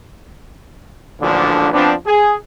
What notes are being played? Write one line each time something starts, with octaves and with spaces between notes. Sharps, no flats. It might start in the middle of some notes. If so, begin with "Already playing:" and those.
A1 D2 A#2 D3 F3 D4
F3 B3 C4 D4
G#4